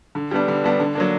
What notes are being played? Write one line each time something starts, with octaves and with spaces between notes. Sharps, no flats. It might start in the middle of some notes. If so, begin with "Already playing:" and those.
D3
G3 B3 D4
D3
G3 B3 D4
D3
F#3 A#3 D4